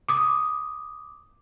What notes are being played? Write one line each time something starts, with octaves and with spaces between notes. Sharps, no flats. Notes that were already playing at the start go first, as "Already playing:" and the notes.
D6 D#6